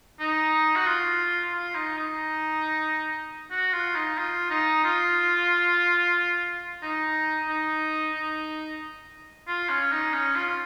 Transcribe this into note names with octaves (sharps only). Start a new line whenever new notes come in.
D#4
F#4
F4
F4
D#4
D#4
F#4
F4
D#4
F4
D#4
F4
D#4
D#4
D#4
F4
C#4
D#4
C#4
F4